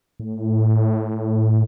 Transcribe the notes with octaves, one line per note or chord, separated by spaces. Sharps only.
A2